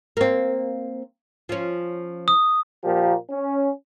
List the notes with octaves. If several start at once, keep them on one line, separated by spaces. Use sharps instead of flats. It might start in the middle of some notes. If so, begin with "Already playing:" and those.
A#3 C4
F3 C#4
D#6
A#2 F3 A#3 G4
C#4